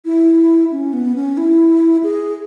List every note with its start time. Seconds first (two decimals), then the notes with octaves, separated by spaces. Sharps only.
0.05 E4
0.72 C#4
0.93 B3
1.16 C#4
1.37 E4
2.04 G#4